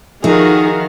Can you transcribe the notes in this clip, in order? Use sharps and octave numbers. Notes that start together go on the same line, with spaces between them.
D#3 F3 D#4 F#4 G#4 A4 E5 F5